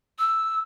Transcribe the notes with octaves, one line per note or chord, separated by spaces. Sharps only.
E6